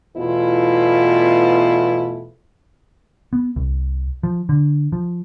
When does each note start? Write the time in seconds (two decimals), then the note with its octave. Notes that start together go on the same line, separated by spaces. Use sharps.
0.17 E2 B2 A3 E4 F4
3.33 B3
3.56 C2
4.23 F3
4.49 D3
4.92 F3